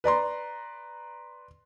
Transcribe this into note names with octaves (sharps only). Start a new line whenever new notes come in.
B4 D5 A#5 C6